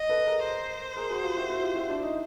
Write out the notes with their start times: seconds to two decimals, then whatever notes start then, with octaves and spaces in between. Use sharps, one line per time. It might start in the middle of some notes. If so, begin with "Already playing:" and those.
Already playing: D#5
0.09 A4 B4
0.27 G#4 A#4
0.44 C5
0.96 G#4 A#4
1.10 F#4 G#4
1.24 F4 G4
1.36 E4 F#4
1.50 E4 F#4
1.63 F4 G4
1.76 E4 F#4
1.89 D4 E4
2.02 D#4